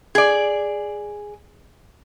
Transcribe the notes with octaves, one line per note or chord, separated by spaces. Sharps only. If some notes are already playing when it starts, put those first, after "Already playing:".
G#4 D5